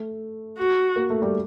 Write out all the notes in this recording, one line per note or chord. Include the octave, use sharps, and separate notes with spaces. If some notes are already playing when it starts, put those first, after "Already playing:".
Already playing: A3
F#4
A#3
A3
G3